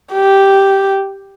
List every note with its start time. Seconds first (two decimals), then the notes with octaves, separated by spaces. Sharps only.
0.13 G4